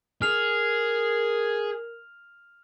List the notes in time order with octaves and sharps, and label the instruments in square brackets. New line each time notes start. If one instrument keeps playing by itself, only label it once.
[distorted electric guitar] G#4 [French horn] A#4 [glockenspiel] F6 F7